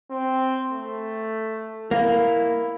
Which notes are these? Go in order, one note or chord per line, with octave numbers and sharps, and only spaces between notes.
C4
A3
A#3 E4